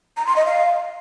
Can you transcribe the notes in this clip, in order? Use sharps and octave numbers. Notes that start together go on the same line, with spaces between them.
A#5
C6
D#5
F5